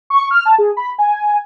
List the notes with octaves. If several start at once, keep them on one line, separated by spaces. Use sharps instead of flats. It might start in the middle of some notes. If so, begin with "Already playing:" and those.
C#6
F6
A5
G#4
B5
G#5